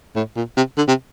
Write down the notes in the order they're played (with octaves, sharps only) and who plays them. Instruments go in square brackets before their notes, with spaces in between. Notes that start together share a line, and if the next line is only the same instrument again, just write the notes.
[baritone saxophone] A2
A#2
C3
D3
C3